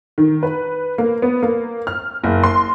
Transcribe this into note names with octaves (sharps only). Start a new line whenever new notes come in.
D#3
B4
A#3
B3
A#3
F6
F#1
C6